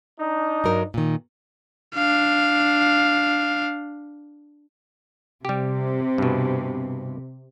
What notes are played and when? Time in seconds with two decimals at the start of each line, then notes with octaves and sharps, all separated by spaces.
0.20 D4 D#4
0.64 G2 F#3 A#4
0.94 A#2 D#3
1.95 D4 F5
5.45 C3 G3 G4
6.18 G2 B2